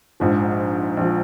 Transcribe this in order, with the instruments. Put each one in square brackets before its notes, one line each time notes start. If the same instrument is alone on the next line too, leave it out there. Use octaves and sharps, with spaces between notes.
[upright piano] A#1 G#2 F3
A#1 F3